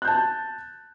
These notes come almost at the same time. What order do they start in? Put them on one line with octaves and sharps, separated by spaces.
F#6 G6 A5